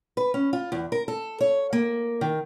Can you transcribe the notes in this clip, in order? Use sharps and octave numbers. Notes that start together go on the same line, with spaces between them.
B4
C#4
F4
E2
A#4
A4
C#5
A#3
D#3